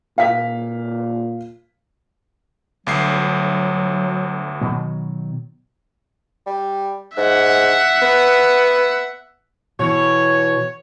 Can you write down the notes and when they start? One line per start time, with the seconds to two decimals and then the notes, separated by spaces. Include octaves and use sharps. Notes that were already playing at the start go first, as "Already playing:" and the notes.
0.18 A#2 F5 B6
2.87 G1 D2 F#3 C7
4.61 B2 D#3 F#3
6.46 G3
7.17 G#2 E5 F#5
8.02 B3
9.79 B2 E3 C#5